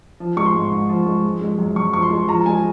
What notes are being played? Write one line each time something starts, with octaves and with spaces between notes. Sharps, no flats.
F3
G#3 C#6
C6
G#2
G#2
F3
G#3
F3
G#3
F#2
F#2 C#6
F3 C#6
C6
G#3
F3 A#5
G#3 G#5